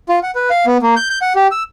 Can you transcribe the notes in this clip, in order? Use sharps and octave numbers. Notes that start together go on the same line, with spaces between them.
F4
F#5
B4
F5
B3
A#3
G6
G6
F#5
G4
E6